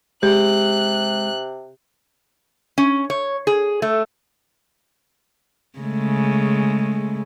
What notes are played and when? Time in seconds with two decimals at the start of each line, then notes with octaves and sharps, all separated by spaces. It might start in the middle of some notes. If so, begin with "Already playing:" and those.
0.23 C3 G#3 G4 F#6
2.78 C#4
3.10 C#5
3.47 G#4
3.82 A3
5.79 C#3 G#3 A3